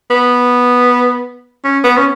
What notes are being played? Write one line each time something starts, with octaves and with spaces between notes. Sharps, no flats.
B3
C#4
B3
C#4